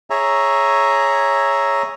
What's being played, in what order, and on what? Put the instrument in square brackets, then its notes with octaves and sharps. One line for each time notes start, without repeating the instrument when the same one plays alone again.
[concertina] G#4 C#5 E5 A#5